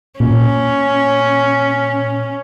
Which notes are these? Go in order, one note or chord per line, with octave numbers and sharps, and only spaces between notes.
A#2 C#4